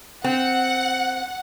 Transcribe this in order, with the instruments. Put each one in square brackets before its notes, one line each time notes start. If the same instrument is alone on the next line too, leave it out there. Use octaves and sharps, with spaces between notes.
[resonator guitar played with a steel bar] C4 [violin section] F#5